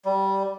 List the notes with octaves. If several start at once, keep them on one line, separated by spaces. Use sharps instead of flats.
G3